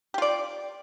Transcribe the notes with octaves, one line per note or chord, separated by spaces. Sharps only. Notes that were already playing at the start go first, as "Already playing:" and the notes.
F4 G4 D5